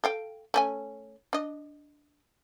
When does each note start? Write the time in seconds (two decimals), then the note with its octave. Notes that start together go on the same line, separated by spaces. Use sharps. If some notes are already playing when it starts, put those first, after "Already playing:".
0.04 A4 F5 G5
0.54 A3 C#4 G#5
1.33 D4 D#5